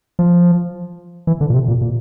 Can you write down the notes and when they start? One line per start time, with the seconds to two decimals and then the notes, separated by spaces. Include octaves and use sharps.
0.19 F3
1.27 E3
1.41 D3
1.50 A#2
1.54 C3
1.68 A#2
1.81 A#2